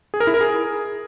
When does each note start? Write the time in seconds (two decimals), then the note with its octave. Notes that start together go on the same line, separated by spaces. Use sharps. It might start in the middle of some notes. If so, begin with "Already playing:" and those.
0.14 G#4
0.20 A#4
0.27 E4
0.34 A#4
0.41 G#4